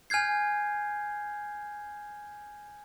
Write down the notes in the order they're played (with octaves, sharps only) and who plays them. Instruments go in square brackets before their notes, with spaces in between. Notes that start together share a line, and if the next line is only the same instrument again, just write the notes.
[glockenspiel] G#5 F6 G6 G#6 C7